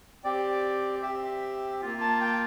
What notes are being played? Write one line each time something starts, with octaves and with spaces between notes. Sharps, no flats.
C4 G4 D5
C4 G4 E5
A#3 F4
A5
G5